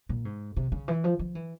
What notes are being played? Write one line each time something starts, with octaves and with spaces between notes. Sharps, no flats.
A#2
G#2
C3
C#3
E3
F3
F3
E3